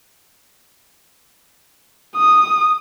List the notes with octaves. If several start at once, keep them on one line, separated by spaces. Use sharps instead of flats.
D#6